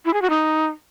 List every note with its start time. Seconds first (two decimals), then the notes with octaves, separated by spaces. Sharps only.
0.05 E4
0.13 G#4
0.22 F#4
0.30 D#4